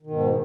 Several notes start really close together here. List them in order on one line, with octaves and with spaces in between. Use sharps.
D#3 B2 G#2